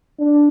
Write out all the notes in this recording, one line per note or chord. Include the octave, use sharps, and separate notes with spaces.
D4